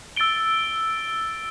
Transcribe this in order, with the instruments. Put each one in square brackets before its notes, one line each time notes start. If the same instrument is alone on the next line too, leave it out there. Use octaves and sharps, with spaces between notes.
[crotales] E6 A6 D7 G7